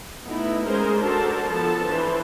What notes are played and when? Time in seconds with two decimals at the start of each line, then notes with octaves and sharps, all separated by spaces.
0.23 A3 B3 D#4 E4
0.66 G#3 C#4 G#4 A#4 C5
0.99 D4 F#4 A4 A#4 C5 A5
1.49 F3 B3 A4 A5
1.85 E3 D4 B4 C5